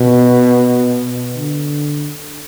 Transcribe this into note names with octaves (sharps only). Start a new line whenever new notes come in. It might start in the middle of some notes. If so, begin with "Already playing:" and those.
Already playing: B2
D3